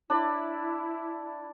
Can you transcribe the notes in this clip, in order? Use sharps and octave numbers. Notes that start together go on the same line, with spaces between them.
D4 E4 D5 B5